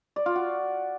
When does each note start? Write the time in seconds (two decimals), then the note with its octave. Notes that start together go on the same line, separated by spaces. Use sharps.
0.16 D5
0.26 F4
0.36 F#4